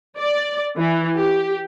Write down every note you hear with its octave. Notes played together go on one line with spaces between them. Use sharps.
D5
E3
G4